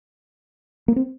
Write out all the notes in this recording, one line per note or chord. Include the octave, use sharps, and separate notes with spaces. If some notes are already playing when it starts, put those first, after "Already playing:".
A#3
C4